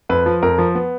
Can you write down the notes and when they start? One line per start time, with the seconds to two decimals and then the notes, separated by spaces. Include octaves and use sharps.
0.09 F2 B4
0.26 F3
0.43 F2 A#4
0.58 F3
0.75 B3